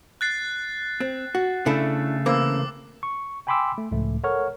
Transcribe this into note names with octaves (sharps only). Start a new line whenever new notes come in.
F#6 A6 C7
C4
F#4
C#3 A3 D4 E4 A4
E3 A#3 C4 D6 E6
C#6
G5 G#5 B5 C6 D6 E6
A3
C#2 A2 F3 A3
A4 A#4 C#5 F#5 C#6 F6